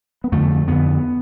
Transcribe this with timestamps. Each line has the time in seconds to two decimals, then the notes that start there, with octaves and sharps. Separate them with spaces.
0.24 B3
0.32 F2 D3 A3
0.68 F2 D3 B3